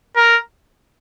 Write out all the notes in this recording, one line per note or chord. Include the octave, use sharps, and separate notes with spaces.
A#4